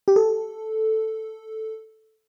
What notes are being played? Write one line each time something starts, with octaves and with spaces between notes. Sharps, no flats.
G4
A4